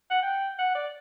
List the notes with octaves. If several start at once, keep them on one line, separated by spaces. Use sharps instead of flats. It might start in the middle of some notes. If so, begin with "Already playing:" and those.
F#5
G5
F#5
D5